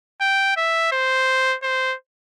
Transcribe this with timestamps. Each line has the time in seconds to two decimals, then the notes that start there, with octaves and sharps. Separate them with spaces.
0.21 G5
0.57 E5
0.92 C5
1.63 C5